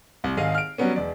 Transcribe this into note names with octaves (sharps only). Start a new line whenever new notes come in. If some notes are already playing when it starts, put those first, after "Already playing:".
C2
G#1 G#4 D#5 F5
F6 D7
F#3 G3 B3 C#4
E1 D5